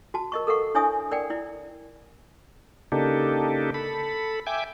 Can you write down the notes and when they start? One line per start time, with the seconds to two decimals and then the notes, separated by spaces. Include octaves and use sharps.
0.14 F#4 A5
0.32 A#4 D#5 C#6
0.47 A4 A#4 F5 F#5 C#6
0.75 D4 E4 C#5 E5 G#5 D#6
1.11 A#4 D5 F#5 G5
1.30 E4 D5
2.92 C#3 A#3 D4 D#4 G4 A4
3.74 A4 B5
4.47 E5 G5 G#5 D6